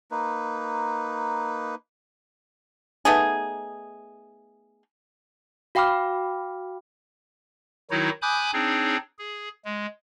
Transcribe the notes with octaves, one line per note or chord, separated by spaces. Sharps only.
A#3 D#4 B4
A3 B3 D#4 G#4
F#4 F5 G5 B5 D6 F6
D#3 F#3 D#4 E4 F#4 C#5
G#5 B5 D6 D#6 F#6 G6
C4 D4 D#4 G#4 C#5
G#4
G#3